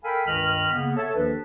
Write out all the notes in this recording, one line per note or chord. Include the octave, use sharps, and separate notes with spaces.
A4 A#4 F5 G5 G#5 B5
C#2 G2 D#3 D#5 B5 F6
C#3 A#3 B3
A4 C#5 E5 A5
D#2 D#3 F3 D4 A4 B4